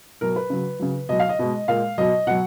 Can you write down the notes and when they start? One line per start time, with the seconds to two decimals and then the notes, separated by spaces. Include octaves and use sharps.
0.21 B2 F#3 A#4
0.36 B4
0.50 C#3 F#3
0.80 C#3 F#3
1.09 B2 F#3 D#5
1.19 F5
1.29 D#5
1.39 B2 G#3
1.68 A#2 G#3 F5
1.98 B2 F#3 D#5
2.27 B2 F#3 F#5